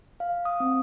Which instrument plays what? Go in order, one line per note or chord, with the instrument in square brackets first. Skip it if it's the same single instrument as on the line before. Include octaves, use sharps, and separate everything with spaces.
[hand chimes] F5
D#6
C4